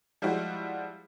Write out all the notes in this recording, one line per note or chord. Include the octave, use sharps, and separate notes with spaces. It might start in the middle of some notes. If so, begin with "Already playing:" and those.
F3 G3 G#3 E4 F#4